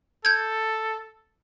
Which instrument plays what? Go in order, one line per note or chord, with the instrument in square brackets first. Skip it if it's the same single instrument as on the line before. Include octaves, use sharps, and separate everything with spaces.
[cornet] A4 [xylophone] G6 G#6